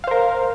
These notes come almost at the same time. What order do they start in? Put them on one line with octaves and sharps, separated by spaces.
F5 C5 A#4